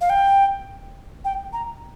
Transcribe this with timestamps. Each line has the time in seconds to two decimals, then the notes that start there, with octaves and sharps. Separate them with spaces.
0.01 F5
0.10 G5
1.25 G5
1.53 A#5